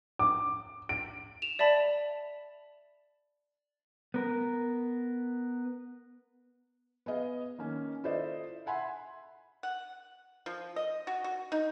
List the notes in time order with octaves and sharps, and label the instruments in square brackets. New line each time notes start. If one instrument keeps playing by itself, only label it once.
[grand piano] D6
D7
[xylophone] E7 F7
D5 E5 A5 B5
[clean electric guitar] B3 A#4
[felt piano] B3 G#4 D#5 F5
D#3 A#3 C#4
E4 F4 A4 C5 D5 D#5
E5 F#5 G#5 B5 C6
[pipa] F#5
F3
D#5
F#4
F#4
D#4